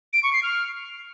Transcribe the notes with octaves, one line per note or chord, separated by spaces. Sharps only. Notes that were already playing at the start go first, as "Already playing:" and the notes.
D7
C#6
C7
F6